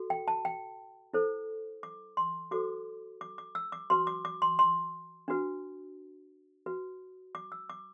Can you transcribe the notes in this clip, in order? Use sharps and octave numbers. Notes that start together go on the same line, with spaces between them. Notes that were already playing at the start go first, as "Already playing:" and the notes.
Already playing: F#4 A4
G5
A5
G5
E4 A4 C5
D6
C6
F#4 A4 C5 D6
D6
D6
E6
D6
F#4 B4 C6
D6
D6
C6
C6
D4 F#4 B4
F#4 B4
D6
E6
D6